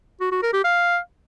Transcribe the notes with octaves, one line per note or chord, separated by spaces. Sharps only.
F#4
F#4
A#4
G4
F5